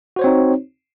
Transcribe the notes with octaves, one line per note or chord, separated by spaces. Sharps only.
C4 D#4 F#4 C5 C#5